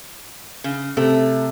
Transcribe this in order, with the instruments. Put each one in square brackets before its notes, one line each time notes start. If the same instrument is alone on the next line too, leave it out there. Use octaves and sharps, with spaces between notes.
[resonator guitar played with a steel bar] C#3
[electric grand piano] C3 [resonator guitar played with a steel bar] A3